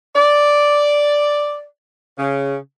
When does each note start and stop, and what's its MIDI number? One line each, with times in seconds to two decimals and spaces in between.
0.16 1.64 74
2.19 2.57 49